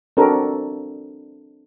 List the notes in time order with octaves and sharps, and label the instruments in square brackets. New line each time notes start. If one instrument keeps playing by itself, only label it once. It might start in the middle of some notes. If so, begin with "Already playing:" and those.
[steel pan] C4 D4 F#4 A4 A#4